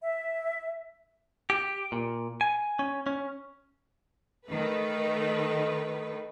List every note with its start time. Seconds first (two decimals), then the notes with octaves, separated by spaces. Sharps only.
0.03 E5
1.50 G4
1.92 A#2
2.41 G#5
2.79 C#4
3.06 C#4
4.46 D#3 A3 B4